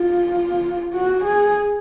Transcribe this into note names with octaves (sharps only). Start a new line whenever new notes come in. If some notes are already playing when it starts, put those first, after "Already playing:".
Already playing: F4
F#4
G#4